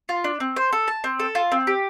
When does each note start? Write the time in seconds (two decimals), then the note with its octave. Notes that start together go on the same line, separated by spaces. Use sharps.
0.09 F4
0.24 D4
0.40 C4
0.56 C5
0.72 A4
0.88 A5
1.04 C4
1.19 A4
1.35 F4
1.52 C4
1.67 G4